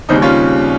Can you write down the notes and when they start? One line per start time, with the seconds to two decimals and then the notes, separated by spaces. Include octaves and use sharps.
0.09 D#2 C#3 G3 C4 D#4
0.22 C#4 F4